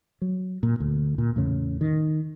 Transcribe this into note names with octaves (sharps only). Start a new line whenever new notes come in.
F#3
A#2
D2
A#2
E2 A2 C#3
D#3